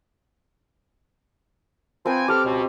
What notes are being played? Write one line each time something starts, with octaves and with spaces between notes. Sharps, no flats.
F3 C4 B4 G5 G#5 C6
G4 A4 C5 D6 F6
C#2 B2